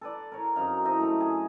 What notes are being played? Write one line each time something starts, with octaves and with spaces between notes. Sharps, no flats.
A4 B4 D5
A#4 C#5
F#2 C4 D#4 F5
E4 A4 C5 D#5
A3 A#5
G#4